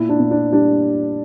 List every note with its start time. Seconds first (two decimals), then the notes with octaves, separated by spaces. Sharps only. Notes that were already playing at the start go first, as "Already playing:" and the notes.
Already playing: A#2 E4
0.09 D4
0.20 A#2
0.31 D4
0.52 G3 D4